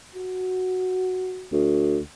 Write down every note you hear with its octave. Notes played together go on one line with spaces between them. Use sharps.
F#4
D2